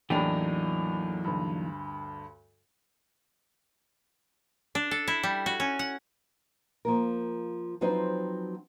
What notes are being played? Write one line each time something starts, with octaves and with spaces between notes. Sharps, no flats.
E2 A2 E3 F#3 A#3 D4 D#4 G4
D2 G2
D4
A4
E4
G3
F#4
C#4
F#5
F3 A#3 A#4
F3 F#3 C4 D#4 B4 C5